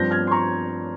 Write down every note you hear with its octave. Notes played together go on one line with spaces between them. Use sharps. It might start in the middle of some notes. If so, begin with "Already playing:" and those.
Already playing: G2 F3 C4 G6 A#6
F6 G#6
C6
A#5 C#6